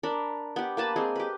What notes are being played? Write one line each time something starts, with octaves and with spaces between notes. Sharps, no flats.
D4 A#4 B5
B3 G4
A#3 B4 A5 B5
G#3 C4 G#4
G4 B4